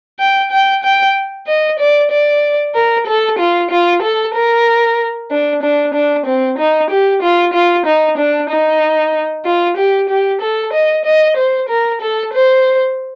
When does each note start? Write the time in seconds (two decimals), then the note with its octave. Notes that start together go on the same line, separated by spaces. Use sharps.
0.19 G5
0.52 G5
0.83 G5
1.47 D#5
1.79 D5
2.11 D5
2.75 A#4
3.07 A4
3.39 F4
3.71 F4
4.02 A4
4.34 A#4
5.31 D4
5.63 D4
5.94 D4
6.26 C4
6.58 D#4
6.91 G4
7.22 F4
7.54 F4
7.86 D#4
8.18 D4
8.50 D#4
9.45 F4
9.77 G4
10.09 G4
10.41 A4
10.73 D#5
11.05 D#5
11.37 C5
11.69 A#4
12.01 A4
12.33 C5